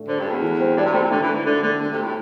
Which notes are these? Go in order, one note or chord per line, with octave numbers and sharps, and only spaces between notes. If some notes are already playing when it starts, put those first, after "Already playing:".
Already playing: A2 A3 D4
D3 C5
G2
A4
E2
E3
C4
G2 D5
C3
A2 C4
C3
D3 A3
E3
A3
D3
D3 A3
D3 A3
D3 A3
C3
A3
A2